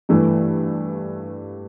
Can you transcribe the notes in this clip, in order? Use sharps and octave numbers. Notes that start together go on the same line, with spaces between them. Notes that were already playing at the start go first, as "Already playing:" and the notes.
G2 E3 A3